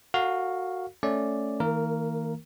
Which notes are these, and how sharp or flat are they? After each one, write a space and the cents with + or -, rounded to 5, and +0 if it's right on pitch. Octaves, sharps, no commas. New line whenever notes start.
F#4 -5 A4 +45 F5 +10
A3 +0 C#4 +0 D5 +0
D#3 +45 A#3 -30 A#4 +0